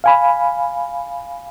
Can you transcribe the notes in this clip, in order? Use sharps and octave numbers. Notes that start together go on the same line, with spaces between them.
F5 G#5 B5